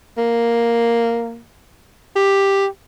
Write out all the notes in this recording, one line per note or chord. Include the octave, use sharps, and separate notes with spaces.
A#3
G4